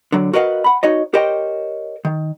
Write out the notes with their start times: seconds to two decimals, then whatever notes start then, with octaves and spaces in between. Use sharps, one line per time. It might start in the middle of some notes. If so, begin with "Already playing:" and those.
0.12 D3 F#3
0.33 F#4 A#4 B4 D#5 F5 F#5
0.64 F#5 B5
0.83 D#4 F#4 C#5 D#5
1.14 G4 A#4 C5 C#5 D#5 G5
2.05 D#3